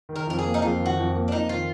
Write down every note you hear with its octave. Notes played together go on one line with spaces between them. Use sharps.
D#3
A#4
F2 A#4
G#4
A#3
D#4
F2 F4
D#3
F#4
F2
A#3
D4
F2 D#4
D#3 F4